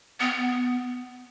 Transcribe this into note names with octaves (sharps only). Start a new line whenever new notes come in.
B3